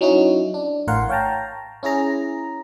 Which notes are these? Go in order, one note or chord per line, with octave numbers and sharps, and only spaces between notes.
F#3 C#4 D#4 E4 F#4
D4
A1 A2 A#4 F5 F#5 C6
C#5 F5 G5 A5 A#5
C#4 E4 G#4 A#5